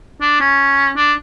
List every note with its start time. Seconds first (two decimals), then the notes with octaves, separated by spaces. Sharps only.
0.21 D4
0.40 C#4
0.96 D4